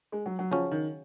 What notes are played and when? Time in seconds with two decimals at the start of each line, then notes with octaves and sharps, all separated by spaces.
0.12 G#3
0.26 F#3
0.39 F#3
0.51 C#3 F3 F#3 C#4
0.71 D#3